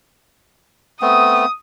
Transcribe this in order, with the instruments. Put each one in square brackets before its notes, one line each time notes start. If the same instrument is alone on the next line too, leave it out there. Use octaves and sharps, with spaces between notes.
[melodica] A3 B3 C4 [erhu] D#6